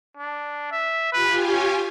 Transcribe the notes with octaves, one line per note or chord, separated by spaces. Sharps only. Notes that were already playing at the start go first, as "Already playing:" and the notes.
D4
E5
F4 G4 B4 G#5
C#4